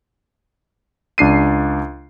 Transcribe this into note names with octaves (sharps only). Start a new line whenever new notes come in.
C#2 D4 C7 D#7